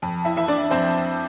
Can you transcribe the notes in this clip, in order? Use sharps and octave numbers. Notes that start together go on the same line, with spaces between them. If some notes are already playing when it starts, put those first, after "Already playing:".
F2
E4 E5
E3 E5
D4 D5
F2 C4 C5